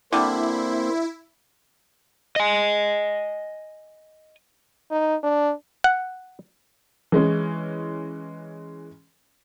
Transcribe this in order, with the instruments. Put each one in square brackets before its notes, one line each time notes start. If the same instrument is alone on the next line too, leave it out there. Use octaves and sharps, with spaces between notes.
[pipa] D3 G3 [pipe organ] A#3 C4 C5 [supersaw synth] E4
[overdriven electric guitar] D#5 G#5
[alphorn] D#4
D4
[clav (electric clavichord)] F#5
[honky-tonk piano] E3 G#3 C#4